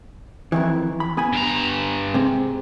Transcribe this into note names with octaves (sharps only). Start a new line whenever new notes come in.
F2 D#3 E3
B5
B3 G#5 B5
G2 A#5
G#2 C3